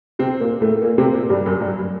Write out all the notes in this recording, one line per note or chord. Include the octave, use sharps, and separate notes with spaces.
C3 C4
A#2 A#3
A2 A3
A#2 A#3
C3 C4
A#2 A#3
G2 G3
G3
F#2 F#3
G2 G3
F#3